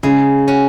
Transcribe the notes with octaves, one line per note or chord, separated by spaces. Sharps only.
C#3 G#3
C#4 F#4